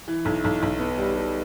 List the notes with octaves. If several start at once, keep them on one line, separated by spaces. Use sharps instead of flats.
E3
B1
B1
B1
B3
G3
G3